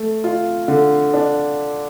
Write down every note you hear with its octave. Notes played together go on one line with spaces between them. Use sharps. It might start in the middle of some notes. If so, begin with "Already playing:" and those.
Already playing: A3
F4
D3
D4